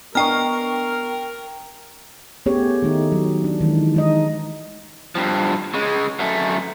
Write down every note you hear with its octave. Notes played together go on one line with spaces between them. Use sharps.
B3 D4 A#4 D#5 G5 A#5 C#6 F6
A3 B3 C#4 G4 G#4 C#5
D#3 A3 D#4
F#3
D4
D#3 E3 G#3
G#3 D#4 D#5
G2 F3
C#3 G#3
F#2 A3